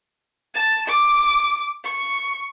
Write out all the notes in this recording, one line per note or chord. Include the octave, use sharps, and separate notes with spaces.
A5
D6
C#6